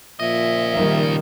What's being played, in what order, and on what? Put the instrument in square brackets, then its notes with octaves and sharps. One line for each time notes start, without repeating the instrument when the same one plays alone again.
[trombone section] A#2 F3 [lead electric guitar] C#3 D#5 [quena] E5
[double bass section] D#3 G3